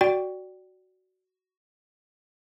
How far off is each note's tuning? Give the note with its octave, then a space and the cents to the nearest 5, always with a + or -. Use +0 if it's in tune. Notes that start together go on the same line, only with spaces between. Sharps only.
F#4 +10 D5 +0 G5 +0